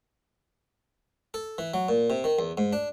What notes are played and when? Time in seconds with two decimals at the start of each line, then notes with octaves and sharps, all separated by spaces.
1.34 A4
1.58 E3
1.74 F#3
1.89 A#2
2.10 C3
2.24 D#3
2.39 E2
2.58 G#2
2.73 D4